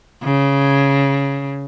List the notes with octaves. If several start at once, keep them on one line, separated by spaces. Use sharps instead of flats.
C#3